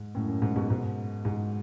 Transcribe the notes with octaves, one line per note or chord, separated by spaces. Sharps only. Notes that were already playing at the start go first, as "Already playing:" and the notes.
Already playing: G#2
F#2 A2
F#2
G#2
G#2 B2
G#2 B2
G#2